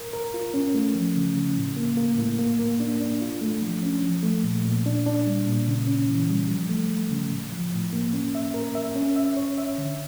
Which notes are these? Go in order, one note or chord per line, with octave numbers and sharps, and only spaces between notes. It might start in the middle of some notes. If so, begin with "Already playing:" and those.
Already playing: A#4
A#4
F4
C#4
A3
F3
C#3
C#3
A2
A#3
A#3
A2
A#3
A#3
D4
D4
F4
A3
F3
C#4
F3
A3
A#2
A#2
D4
D4
G3
A#2
C#3
C#4
E3
G3
F3
A3
A3
C#3
A2
F3
A2
A#3
C#4
E5
A#4
E5
C#4
E5
C#5
E5
D3